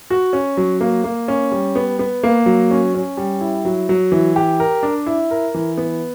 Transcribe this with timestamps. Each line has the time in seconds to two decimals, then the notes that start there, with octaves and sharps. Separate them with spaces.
0.10 F#4
0.33 C#4
0.57 F#3
0.81 A#3
1.04 A#3
1.28 C#4
1.52 G3
1.76 B3
1.99 B3
2.23 A#3
2.46 F#3
2.71 C#4
2.95 C#4
3.17 G3
3.41 E4
3.65 F#3
3.89 F#3
4.12 E3
4.36 G4
4.60 A#4
4.83 D4
5.06 E4
5.31 A#4
5.54 E3
5.77 B3